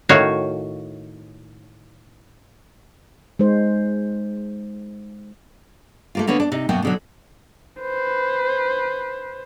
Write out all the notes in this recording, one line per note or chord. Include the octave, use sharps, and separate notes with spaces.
A2 D#3 F#4 C#5 F5
G#3 D#4 C5
A3 A#3 F4
D3 A#3 B3 C#5
D4
C3 D#4
F#2 B2 A#3 F#4 G5
B2 D3 F#3
B4 C5